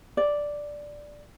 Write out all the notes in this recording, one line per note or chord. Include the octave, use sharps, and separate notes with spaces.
D5